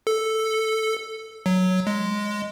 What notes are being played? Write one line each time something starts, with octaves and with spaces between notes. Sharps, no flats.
A4
F#3
G#3